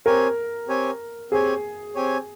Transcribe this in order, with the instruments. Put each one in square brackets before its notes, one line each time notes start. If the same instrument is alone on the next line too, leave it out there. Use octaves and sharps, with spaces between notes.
[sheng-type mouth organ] C4 G4 C#5 G#5 [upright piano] A#4
[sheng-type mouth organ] C4 G4 C#5 G#5
[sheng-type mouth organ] C4 G4 C#5 G#5 [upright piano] G#4
[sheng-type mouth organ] C4 G4 C#5 G#5